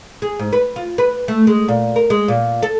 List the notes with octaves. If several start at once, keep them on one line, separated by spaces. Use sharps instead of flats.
G#4
G#2
B4
F4
B4
A3
G#3
A#2
A#4
G#3
A#2
A4